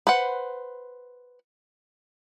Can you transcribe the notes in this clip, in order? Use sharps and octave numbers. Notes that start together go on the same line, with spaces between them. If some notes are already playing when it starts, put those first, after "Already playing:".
B4 C5 F#5